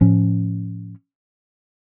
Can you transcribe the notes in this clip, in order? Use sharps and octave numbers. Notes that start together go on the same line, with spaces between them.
A2 F3 C#4